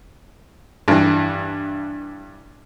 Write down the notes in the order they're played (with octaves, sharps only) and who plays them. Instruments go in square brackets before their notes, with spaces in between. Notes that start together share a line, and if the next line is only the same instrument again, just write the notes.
[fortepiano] G2 E3